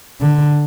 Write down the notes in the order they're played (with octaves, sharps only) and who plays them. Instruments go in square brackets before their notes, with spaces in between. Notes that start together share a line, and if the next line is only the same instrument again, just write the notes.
[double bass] D3